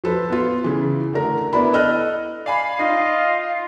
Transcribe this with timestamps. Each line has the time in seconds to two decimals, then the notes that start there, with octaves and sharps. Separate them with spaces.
0.04 F3 A4 B4
0.30 B3 F4
0.64 C#3 E3
1.13 D3 A3 A#4
1.53 B3 D4 E4 B5
1.73 A4 D#5 F6 F#6
2.46 D5 F5 G#5 B5
2.79 D#4 F4 D#5